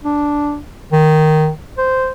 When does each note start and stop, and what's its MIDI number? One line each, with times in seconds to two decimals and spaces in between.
0.04 0.58 62
0.92 1.50 51
1.78 2.12 72